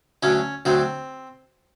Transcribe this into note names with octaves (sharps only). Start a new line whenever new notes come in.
D2 D3 F#3 C#4
D2 D3 F#3 C4